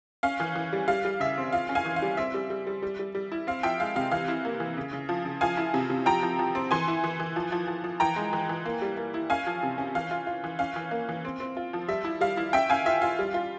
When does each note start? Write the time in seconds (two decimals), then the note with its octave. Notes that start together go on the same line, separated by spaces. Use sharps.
0.23 C#4 F5
0.40 E3
0.55 E3
0.73 G3
0.88 G3 F5
1.05 G3
1.20 C#3 E5
1.37 C4
1.53 F4 F5
1.69 C#4
1.75 F5 G#5
1.85 E3
1.96 F5
2.02 G3
2.17 C4 E5
2.34 G3
2.50 G3
2.67 G3
2.82 G3
2.99 G3
3.15 G3
3.32 E4
3.47 C4 F5
3.63 F3 E5 G5
3.80 G#3 F5
3.96 C3 F5
4.11 E3 F5
4.28 E4
4.45 A#3
4.60 E3
4.77 C#3
4.93 C#3
5.09 F3
5.25 C#3
5.41 F3 F5 G#5
5.57 E4
5.74 C3
5.90 C3
6.06 F3 G5 A#5
6.23 F3
6.39 F3
6.55 C4
6.71 E3 G#5 C6
6.88 E4
7.04 E3
7.19 E3
7.36 F3
7.52 F3
7.68 F3
7.84 F3
8.00 E3 G5 A#5
8.16 G#3
8.33 E3
8.49 E3
8.66 A#3
8.82 G3
8.97 A#3
9.14 E4
9.30 C#4 F5 G#5
9.46 F3
9.63 C3
9.78 C#4
9.95 E3 F5
10.11 F4
10.27 F4
10.44 E3
10.59 C#4 F5
10.76 E3
10.91 A#3
11.09 E3
11.25 C4
11.40 C4
11.57 F4
11.73 F3
11.88 G3 E5
12.05 E4
12.21 G3 F5
12.37 E4
12.53 C#4 E5 G5
12.70 C#4 F5 G#5
12.86 F4 E5
13.02 F4 F5
13.19 G3
13.34 F4